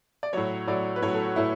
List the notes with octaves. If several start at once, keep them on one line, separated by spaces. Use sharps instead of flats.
D5
A2 F#3 C#5
A2 F#3 D5
B4
A2 F#3 C#5
A4
F#4
A2 E4